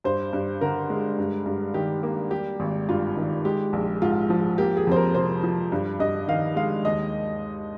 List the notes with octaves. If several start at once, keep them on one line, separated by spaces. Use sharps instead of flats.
G2 C5
G2
D3 A#4
G#3
G2
G2
D#3 G4
A#3
G3 G4
G#1
G2 F4
D#3
G#3 G4
A#1
G#2 F4
F3
A#3 G4
G#4
F2 C5
A#4
C3 C5
F3
G2
G2 D#5
D#3 F5
G#3 F5
D#2 D#5